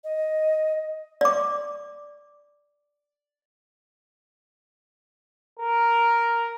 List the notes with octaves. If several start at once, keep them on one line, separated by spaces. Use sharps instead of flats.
D#5
D5 D6
A#4